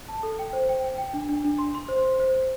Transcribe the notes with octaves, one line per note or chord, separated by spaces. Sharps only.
A5
A4
G5
C5
G5
G5
G5
D4
D4
D4
C6
C6
C5
C5
C5
C5